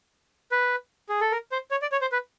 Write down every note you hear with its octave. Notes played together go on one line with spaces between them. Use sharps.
B4
G#4
A4
A#4
C5
C#5
D5
C#5
C5
B4